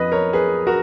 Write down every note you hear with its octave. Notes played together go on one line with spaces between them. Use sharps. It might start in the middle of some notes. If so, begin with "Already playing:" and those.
Already playing: F2 F3 B4 D#5
A#4 C#5
G#4 B4
F#4 A#4